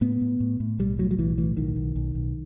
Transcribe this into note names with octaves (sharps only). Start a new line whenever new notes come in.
A2 B3
A2
A2
A2
B1 G3
A2 F#3
F#3
B1 E3
A2 E3
B1 D#3
B1
B1
B1